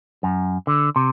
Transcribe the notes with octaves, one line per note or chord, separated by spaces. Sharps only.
F#2
D3
C3